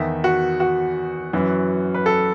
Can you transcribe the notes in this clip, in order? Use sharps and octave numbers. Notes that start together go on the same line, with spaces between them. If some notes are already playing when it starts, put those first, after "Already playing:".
Already playing: E2 D#3 E5
F#4
F#4
F#2 E3
B4
A4